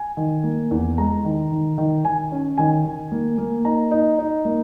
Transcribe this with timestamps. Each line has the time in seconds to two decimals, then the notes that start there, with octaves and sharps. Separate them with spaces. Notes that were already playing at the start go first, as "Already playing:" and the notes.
Already playing: G#5
0.17 D#3
0.44 A#3
0.71 E2
0.98 G#3 A#5
1.25 D#3
1.52 D#3
1.78 D#3
2.05 D#3 G#5
2.32 C#4
2.58 D#3 G#5
2.85 D#3
3.12 A#3
3.38 A#3
3.64 D#4 A#5
3.91 D#4
4.19 D#4
4.45 A#3